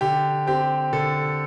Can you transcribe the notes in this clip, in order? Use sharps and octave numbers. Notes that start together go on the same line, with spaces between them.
D3 G4
C4 G4
D3 A4